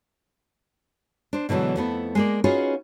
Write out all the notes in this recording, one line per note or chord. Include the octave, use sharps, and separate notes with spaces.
D4 C5
B2 D3 E3 F#3 G#3
F2 A3 B3 E4
G#3 A#3 D5
C#4 D#4 F4 F#4 G#4 B4